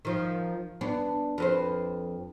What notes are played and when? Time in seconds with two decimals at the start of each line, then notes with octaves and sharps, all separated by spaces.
0.05 D#3 F3
0.81 B3 D4
1.38 F2 B4 C5